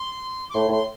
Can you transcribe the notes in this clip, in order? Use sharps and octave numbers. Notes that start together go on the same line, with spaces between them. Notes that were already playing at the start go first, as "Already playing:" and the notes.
Already playing: C6
D6
A2 C6
A2 C6